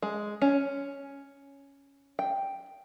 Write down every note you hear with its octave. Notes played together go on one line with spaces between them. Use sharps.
G#3
C#4
G5